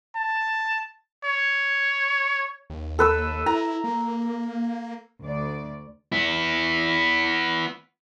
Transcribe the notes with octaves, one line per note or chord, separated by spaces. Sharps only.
A5
C#5
D#2
A4 B4 E6
E4 A#5
A#3
D2 D5
B3 E4